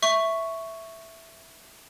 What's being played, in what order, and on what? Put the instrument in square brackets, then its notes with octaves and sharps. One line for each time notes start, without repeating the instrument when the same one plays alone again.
[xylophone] E5 C#6